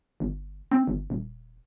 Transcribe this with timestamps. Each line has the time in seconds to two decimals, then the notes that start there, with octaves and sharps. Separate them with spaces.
0.20 G1
0.71 C4
0.87 G1
1.10 D#1